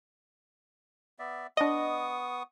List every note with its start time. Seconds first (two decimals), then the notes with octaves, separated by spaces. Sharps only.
1.19 B3 D5 E5
1.57 B3 D4 D#5 C#6 D#6